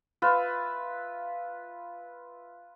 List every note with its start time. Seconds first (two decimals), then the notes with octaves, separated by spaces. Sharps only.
0.22 F4 B4 E5